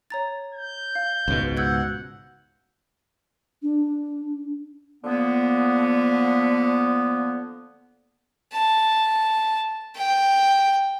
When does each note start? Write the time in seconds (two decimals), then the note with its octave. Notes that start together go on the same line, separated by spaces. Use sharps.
0.10 C#5 A#5 A6
0.54 G6
0.95 F5
1.28 C#2 G#2 B2
1.57 F#5 E6 G6 G#6
3.62 D4
5.03 D3 F3 A#3 B3
8.53 A5
9.96 G5